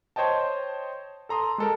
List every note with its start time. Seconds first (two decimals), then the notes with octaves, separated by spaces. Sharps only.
0.16 C5 C#5 D#5 G5 A5
1.29 A4 A#5 C6 D#6
1.58 G#3 A4 A#4